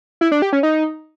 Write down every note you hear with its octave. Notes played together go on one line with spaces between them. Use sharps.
E4
D4
G4
C#4
D#4